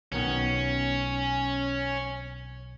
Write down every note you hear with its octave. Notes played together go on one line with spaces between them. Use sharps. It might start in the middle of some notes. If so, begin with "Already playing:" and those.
B1 D#3 B3 C#4